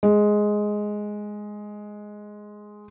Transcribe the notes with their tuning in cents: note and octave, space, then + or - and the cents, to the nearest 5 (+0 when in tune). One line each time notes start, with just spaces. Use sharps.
G#3 +5